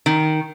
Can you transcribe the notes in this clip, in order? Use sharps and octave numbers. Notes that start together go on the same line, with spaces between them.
D#3